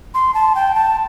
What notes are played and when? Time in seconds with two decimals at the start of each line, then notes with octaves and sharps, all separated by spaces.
0.14 C6
0.34 A5
0.55 G5
0.75 A5